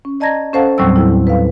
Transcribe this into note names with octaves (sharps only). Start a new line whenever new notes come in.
C#4
D5 D#5 A5 A#5 G#6 A#6
C#4 A4 C5 F5 F#5 A5
D#2 A2 F#3 G3 C4 E6
E4
B4 F5